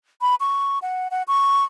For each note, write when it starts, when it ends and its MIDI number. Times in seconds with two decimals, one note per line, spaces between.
0.21 0.35 83
0.40 0.79 85
0.82 1.08 78
1.11 1.23 78
1.28 1.64 85